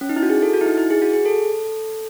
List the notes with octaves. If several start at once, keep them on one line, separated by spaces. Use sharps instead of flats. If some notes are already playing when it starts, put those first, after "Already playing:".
C#4
D#4
E4
F#4
G#4
A4
F#4
E4
D#4
E4
G#4
F#4
G#4
A4